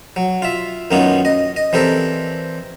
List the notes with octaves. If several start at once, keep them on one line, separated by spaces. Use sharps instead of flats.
F#3
F4 E5
F#2 D#3 A#3 B3 C#4 F4
D#5
D#5
E3 C4 G4 A4 A#4 D5